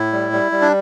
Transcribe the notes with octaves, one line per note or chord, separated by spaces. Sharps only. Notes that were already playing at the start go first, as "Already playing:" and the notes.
Already playing: A2 E4
G3
G3
G3
D4